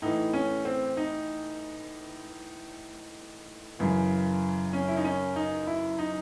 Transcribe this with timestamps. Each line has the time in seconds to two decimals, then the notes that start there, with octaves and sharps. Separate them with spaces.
0.02 A2 E3 D#4
0.33 C#4
0.65 C4
0.97 D#4
3.79 F#2 C#3 E3
4.73 C#4
4.88 E4
4.97 D#4
5.05 C#4
5.36 D#4
5.67 E4
5.98 D#4